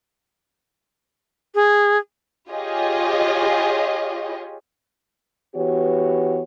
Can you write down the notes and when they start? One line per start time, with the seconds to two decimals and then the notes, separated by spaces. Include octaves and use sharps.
1.55 G#4
2.51 F4 G4 G#4 C#5 D#5
5.55 E3 B3 F#4 G4 B4 C#5